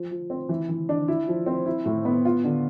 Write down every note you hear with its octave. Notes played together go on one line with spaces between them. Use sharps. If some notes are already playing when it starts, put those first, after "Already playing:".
Already playing: F3
F3
C4
E3
E3
D4
E4
F3
C4
E4
A2
B3
F4
D3